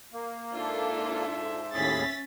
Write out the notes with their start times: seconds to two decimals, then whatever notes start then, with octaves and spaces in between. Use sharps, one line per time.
0.13 A#3
0.53 G#2 D4 F4 A4 C5 E5
1.73 D#2 A2 C#4 G#4 A6 B6